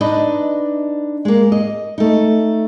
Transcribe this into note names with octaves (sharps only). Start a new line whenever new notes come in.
D4 D#4 B4 D#5
G#3 A#3
D#5
A3 D#4